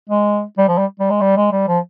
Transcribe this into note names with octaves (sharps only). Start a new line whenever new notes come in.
G#3
G3
F3
G3
G3
G#3
G3
G#3
G3
F3